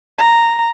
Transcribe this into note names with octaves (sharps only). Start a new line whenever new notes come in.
A#5